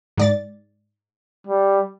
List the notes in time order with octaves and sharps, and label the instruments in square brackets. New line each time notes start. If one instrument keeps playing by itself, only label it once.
[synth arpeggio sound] G#2 D5 A6
[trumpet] G3